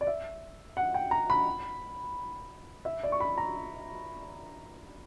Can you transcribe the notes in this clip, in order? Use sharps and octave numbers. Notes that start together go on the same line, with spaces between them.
D5
E5
F#5
G5
A#5
B5
E5
D5
C#6
B5
A#5